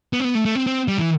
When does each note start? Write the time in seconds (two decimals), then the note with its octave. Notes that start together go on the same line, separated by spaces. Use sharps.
0.13 B3
0.20 C4
0.24 B3
0.35 A3
0.45 A3
0.55 C4
0.67 C4
0.88 G3
0.99 E3